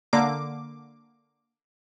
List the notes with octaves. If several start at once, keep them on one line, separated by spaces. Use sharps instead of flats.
D3 A#3 D6